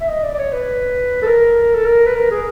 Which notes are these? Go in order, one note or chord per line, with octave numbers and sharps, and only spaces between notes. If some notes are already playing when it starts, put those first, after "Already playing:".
E5
D#5
D5
D5
C#5
B4
A4
A#4
A4
A#4
B4
A#4
G#4